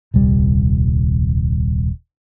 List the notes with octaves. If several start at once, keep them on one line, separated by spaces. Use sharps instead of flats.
D#1 C2 G3